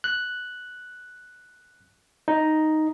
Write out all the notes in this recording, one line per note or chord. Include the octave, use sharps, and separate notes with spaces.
F#6
D#4